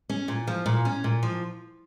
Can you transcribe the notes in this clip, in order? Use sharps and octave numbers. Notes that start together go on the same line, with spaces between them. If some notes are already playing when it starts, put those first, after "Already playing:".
C#4
A#2
F3
A#2
C#4
A#2
F3